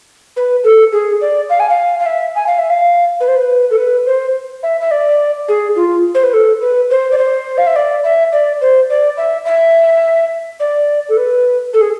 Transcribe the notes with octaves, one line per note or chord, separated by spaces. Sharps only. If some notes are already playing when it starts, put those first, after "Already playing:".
B4
A4
G#4
D5
F5
G#5
F5
F5
E5
G#5
F5
E5
F5
B4
C5
B4
A4
B4
C5
E5
E5
D5
G#4
F4
C5
B4
A4
B4
C5
D5
C5
F5
E5
D5
E5
D5
C5
D5
E5
E5
D5
A4
B4
A4
G#4